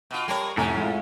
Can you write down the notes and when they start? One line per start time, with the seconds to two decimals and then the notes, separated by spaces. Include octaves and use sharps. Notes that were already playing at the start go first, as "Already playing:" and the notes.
0.11 B2 F4
0.28 G3 A#4 C#5 G5 A5
0.57 F1 F#2 A2 C#4 G#5 A#5
0.77 G#3 F4